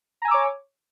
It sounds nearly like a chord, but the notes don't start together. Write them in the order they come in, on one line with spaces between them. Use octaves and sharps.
A#5 G#5 E6 D6 C#5